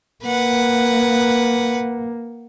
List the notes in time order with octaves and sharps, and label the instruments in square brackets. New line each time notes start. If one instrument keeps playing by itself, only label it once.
[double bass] A#3 [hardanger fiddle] B4 F#5